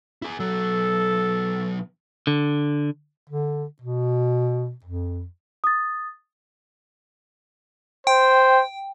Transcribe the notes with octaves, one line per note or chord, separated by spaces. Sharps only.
E4 G#4
B1 F#3 A4
D3
D3
B2
F2
D#6 A6
C5 G5